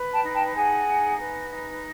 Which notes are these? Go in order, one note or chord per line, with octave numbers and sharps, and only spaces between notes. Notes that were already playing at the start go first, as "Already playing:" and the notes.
Already playing: B4
G5 A5
D#4
G5 A5
G#4 F#5 G#5
D#4
B4
D#4